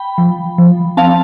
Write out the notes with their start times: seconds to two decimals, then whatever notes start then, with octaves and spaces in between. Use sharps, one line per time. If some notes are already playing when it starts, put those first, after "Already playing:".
Already playing: G5 B5
0.18 F3
0.58 F3
0.97 C4 F5 A5